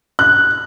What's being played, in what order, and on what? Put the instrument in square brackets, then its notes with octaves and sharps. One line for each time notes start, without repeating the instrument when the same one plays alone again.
[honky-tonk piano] F#6